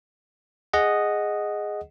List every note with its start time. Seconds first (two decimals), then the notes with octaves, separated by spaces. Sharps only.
0.73 G#4 D#5 F#5